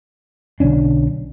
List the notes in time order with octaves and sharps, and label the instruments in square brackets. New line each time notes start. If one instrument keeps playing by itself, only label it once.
[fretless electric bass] B1 D3 C#4 D4